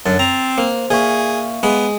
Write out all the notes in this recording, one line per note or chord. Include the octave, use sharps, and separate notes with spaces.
F#2 D3 A6
C4 A#5
A#3 C5
A#2 G#4 E5 F5 C#6
G#3 B3